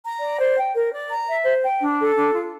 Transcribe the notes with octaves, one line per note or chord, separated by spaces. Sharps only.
A#5
D5
C5
G5
A#4
D5
A#5
E5
C5
G5
D4
A4
D4
F4